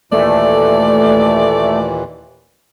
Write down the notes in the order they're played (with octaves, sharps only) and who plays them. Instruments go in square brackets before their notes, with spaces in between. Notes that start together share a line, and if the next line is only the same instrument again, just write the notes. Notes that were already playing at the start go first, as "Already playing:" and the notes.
[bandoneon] D#2 A#2 E3 [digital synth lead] A3 [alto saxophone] D5